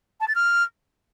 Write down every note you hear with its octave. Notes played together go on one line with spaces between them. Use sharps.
A5
A6
F6